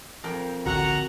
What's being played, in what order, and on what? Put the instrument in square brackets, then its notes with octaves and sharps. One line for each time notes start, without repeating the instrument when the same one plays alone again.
[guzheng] F2 A#4 G5
[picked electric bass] A1 D2 D3 [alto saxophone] F#4 [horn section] F#5 A#5